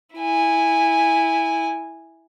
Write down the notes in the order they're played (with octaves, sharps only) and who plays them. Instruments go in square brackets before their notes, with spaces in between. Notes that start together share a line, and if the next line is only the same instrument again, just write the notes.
[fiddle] E4 G#5